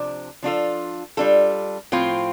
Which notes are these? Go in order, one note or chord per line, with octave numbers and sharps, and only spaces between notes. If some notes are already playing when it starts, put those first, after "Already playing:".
Already playing: C3 F3 D4
F3 D4 F4 A4
G3 D4 F4 A4
A2 F3 C4 F4